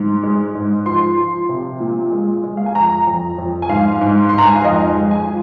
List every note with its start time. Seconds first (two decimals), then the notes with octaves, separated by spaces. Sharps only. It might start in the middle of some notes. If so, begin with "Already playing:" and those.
Already playing: G#2
0.23 G#3
0.55 G#2
0.86 F3 C6
1.17 F3
1.49 C3
1.80 A#2
2.12 G#3
2.44 G#3
2.57 F5
2.66 G#5
2.75 F2 A#5
3.07 F2
3.38 F2
3.62 G#5
3.69 G#2 F5
4.01 G#2
4.29 G#2 C6
4.38 A#5
4.47 G#5
4.56 F5
4.64 F2 D#5
4.95 G#3
5.11 G#5
5.27 F3